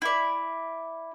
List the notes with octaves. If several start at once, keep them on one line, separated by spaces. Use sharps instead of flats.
E4 D5